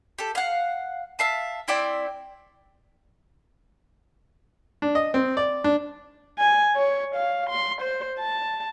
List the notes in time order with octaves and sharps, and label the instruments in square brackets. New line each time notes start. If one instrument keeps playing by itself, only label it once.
[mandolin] G4 A4
F5 F#5
E5 F5 A5
C4 E4 D5 G5
[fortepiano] D4
D#5
C4
D5
D4
[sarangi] G#5
C#5
F5
C6
C5
A5